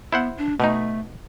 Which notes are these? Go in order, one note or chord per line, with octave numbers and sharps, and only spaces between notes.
B3 E4 C5 F#5
D4
B2 A3 D#4